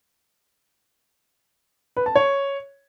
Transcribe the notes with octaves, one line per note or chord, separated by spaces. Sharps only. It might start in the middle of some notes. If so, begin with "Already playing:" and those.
B4
A5
C#5